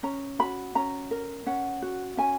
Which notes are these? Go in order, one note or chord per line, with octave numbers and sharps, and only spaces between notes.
C#4 A#5
F#4 B5
C#4 A#5
A#4
C#4 F#5
F#4
C#4 G#5